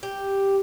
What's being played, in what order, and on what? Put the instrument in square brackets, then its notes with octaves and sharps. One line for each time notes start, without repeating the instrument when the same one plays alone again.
[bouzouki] G4